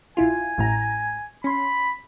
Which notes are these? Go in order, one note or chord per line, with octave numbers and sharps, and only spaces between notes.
A#1 E4 F4 G#5
A1 A2 A#5
C#4 B5 C6